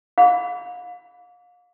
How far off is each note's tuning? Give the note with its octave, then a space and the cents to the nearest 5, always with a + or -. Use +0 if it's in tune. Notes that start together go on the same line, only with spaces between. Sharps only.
F5 +35 B5 +0 D6 -35